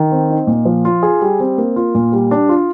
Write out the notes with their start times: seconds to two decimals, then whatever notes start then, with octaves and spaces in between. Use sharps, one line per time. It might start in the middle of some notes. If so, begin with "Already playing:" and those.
Already playing: D#3
0.12 C4
0.30 D#4
0.47 A#2
0.65 F3
0.85 F4
1.03 G#4
1.21 G3
1.40 C4
1.58 A#3
1.76 F4
1.95 A#2
2.12 G3
2.31 D4
2.49 F4